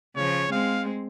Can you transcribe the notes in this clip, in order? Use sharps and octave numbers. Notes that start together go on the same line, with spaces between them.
C#3 F3 C#5
G#3 C4 F5